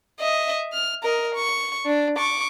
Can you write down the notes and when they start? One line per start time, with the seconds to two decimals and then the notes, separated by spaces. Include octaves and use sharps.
0.20 D#5 E5
0.73 F6
1.03 A#4 D#5
1.35 C#6
1.86 D4
2.18 C#6 D6